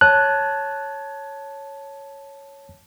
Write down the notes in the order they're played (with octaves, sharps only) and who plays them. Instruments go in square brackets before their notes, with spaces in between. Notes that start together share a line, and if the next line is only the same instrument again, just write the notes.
[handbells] C#5 A5 [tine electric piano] F#6